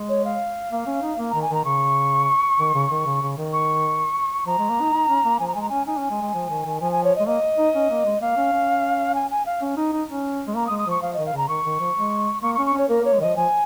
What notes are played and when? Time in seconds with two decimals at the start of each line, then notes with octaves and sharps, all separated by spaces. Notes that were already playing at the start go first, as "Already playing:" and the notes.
Already playing: G#3
0.09 C#5
0.25 F5
0.72 A#3
0.87 C#4
1.02 D#4
1.18 A#3
1.30 D#3 A#5
1.42 G#5
1.50 D#3 A#5
1.65 C#3 C#6
2.59 D#3
2.74 C#3
2.91 D#3
3.06 C#3
3.22 C#3
3.37 D#3
3.53 C#6
4.46 F3 A#5
4.59 G#3
4.70 A#3
4.81 D#4
4.93 D#4
5.08 C#4
5.24 A#3
5.39 F3 G#5
5.48 A#5
5.55 G#3 G#5
5.62 A#5
5.69 C#4 G#5
5.87 D#4 G#5
5.98 C#4
6.10 G#3
6.22 G#3
6.34 F3
6.49 D#3
6.65 D#3
6.80 F3 G#5
6.92 G#5
7.04 C#5
7.16 D#5
7.20 G#3
7.27 A#3 D#5
7.58 D#4
7.75 C#4
7.90 A#3
8.05 G#3
8.21 A#3 F5
8.36 C#4
8.52 C#4
9.15 G#5
9.31 G#5
9.46 F5
9.61 C#4
9.77 D#4
9.93 D#4
10.09 C#4
10.47 G#3
10.56 A#3 A#5
10.67 D#6
10.71 G#3
10.79 D#6
10.86 F3 C#6
11.02 F3 F5
11.14 D#3 D#5
11.26 F5
11.33 C#3 A#5
11.49 D#3 C#6
11.65 D#3
11.80 F3
11.96 G#3
12.42 A#3 C#6
12.55 C#6
12.59 C#4
12.66 C#6
12.73 C#4 C#5
12.89 A#3 A#4
13.02 A#3
13.05 C#5
13.13 G#3
13.20 D#3 F3 D#5
13.36 F3 G#5